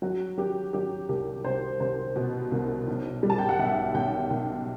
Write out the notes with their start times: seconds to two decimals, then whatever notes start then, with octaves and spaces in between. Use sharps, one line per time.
0.02 F#3 F#4
0.38 F#3 G4
0.73 F#3 G4
1.09 C2 G4
1.44 C2 C5
1.80 C2 C5
2.16 B2
2.51 C2
2.87 B1
3.23 G3
3.30 A5
3.38 G5
3.49 F#5
3.59 B1 E5
3.94 B1 G5
4.30 B1